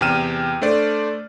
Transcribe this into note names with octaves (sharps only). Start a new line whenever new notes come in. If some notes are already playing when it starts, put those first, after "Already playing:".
E2 C3 G5 F6 D#7 E7
A3 D4 C5 D5